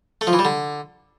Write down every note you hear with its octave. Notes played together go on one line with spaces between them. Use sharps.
A3
F3
E3
G3
D3